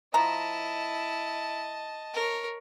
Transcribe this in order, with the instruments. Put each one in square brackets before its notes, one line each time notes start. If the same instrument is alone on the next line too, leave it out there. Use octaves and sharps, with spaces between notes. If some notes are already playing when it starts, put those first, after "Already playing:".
[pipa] F3 A#5 [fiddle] E4 [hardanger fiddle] D#5 A5
[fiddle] A#4 C#5